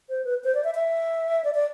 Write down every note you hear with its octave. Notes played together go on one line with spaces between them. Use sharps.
C5
B4
C5
D5
E5
E5
D5
D5